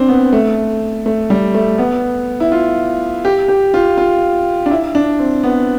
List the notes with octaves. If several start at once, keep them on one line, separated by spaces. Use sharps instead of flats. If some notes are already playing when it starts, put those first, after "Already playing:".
Already playing: C4 D4
B3
A3
A3
G3
A3
B3
E4
F4
G4
G4
F4
F4
D4
E4
D4
C4
B3